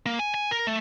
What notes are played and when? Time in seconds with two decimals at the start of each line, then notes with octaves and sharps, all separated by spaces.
0.06 A#3
0.19 G#5
0.34 G#5
0.51 A#4
0.67 A3